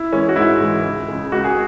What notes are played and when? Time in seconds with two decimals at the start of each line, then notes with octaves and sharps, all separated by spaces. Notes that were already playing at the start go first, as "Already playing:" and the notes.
Already playing: E4
0.13 E3 G#3 C#4
0.29 F#4
0.36 G#2 E4
0.61 E3 G#3
0.85 C#2
1.08 C#3 G#3
1.32 C#2 F#4
1.44 G#4